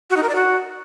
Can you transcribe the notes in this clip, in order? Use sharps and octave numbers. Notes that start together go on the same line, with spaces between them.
F#4
D#4
A#4
D5
F#4